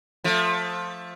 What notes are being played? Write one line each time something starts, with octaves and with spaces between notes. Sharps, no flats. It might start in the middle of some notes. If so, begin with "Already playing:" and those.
F3 A3